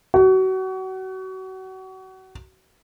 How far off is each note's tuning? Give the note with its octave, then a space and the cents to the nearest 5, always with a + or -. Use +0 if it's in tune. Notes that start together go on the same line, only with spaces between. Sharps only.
F#4 +30